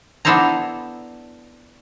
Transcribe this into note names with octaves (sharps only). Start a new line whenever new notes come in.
B3 D4 E4 A4 C5 A#5